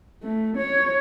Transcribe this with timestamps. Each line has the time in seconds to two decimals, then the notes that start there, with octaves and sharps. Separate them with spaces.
0.23 A3
0.56 C#5